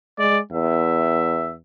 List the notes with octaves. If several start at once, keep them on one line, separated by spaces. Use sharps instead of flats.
G#3 D5
E2 E5